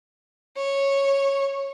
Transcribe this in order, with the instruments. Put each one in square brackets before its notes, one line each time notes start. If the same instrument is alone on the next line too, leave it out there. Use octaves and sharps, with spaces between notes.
[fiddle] C#5